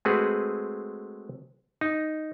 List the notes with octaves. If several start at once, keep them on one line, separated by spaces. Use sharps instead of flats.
G#3 A3 C4 F#4 G#4 B4
D#4